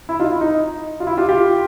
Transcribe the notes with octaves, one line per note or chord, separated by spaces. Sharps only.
E4
D#4 F4
E4
D#4
F4
E4
F4 G4
F4 G4